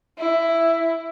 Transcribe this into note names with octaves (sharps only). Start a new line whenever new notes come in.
E4